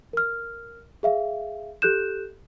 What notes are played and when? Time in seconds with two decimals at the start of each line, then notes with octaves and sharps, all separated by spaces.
0.13 A#4 F6
1.03 G#4 E5 F5
1.82 G4 A4 F#6 G6 E7